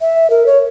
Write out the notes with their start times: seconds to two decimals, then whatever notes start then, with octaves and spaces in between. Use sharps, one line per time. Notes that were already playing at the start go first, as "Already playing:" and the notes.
0.01 E5
0.30 A#4
0.46 C#5